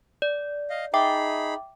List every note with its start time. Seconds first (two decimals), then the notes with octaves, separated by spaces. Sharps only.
0.22 D5
0.70 D#5 F5
0.94 D#4 G#4 E5 G5 B5 D6